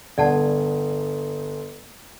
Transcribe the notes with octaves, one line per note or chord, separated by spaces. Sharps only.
G1 D5 F#5 A5